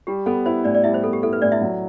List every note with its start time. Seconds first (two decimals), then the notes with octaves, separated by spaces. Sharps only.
0.07 G3 G4
0.26 B3 A4
0.46 E4 C5
0.64 A2 D4 D5
0.75 D5
0.84 G3 E4 E5
0.94 C5
1.03 B3 A4
1.13 G4
1.23 E4 A4
1.33 B4
1.42 A2 D4 D5
1.52 E4 E5
1.61 F#3